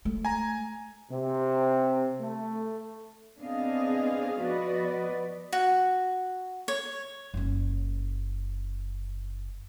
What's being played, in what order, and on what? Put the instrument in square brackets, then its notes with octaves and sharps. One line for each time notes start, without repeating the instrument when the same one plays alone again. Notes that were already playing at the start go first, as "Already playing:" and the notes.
[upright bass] A3
[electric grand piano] G#5 A#5
[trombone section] C3
A3
[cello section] B3 C4 D4 G#4 D#5 F5
F3 B3 F#4 B4 D5 D#5
[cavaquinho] F#4
C#5
[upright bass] F#1 C#4